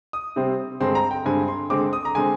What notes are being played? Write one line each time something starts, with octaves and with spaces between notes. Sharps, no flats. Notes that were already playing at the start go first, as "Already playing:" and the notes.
D#6
C3 G3 C4
G2 D3 G#3 C4 C6
A#5
G5
G2 D3 G#3 C4 G#5
C6
D3 G#3 C4 D6
D#6
A#5
D3 G#3 C4 G#5